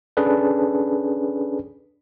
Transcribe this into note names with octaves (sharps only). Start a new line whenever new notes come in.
C#4 D4 G#4 A4 B4